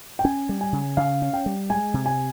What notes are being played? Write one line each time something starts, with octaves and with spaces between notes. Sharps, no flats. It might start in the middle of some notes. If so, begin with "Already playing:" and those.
G5
C#4 G#5
G3
G#5
C#3
C#3 F5
C#4
G5
G3
G#3 G#5
C3
G#5